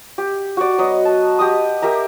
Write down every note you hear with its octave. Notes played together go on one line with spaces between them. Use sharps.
G4
F#4 D5
F#3 B3 D#5
A5
G4 D#5 D#6
G4 A#4 E5 A#5